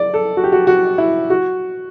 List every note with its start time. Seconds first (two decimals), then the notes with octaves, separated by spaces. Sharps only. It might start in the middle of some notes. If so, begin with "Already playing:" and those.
Already playing: D5
0.14 A4
0.37 F#4
0.44 G4
0.52 F#4
0.67 F#4
0.98 E4
1.30 F#4